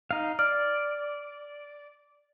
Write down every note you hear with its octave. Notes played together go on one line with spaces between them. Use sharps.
D#4 F5
D5 F6